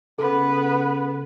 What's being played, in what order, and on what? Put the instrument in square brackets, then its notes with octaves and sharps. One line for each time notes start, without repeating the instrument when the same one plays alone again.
[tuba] C#3 [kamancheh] B3 B4 [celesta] A4